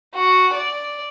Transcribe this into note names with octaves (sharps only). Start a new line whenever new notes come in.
F#4
D5